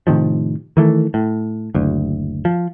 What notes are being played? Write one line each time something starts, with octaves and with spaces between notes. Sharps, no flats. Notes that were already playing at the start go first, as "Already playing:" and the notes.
A2 C3 D#3 F3
D#3 E3 A3
A2
F#1 D2
F3